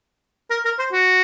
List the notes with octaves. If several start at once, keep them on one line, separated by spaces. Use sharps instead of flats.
A#4
A#4
C5
F#4